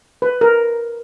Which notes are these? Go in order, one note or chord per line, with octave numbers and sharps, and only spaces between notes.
B4
A#4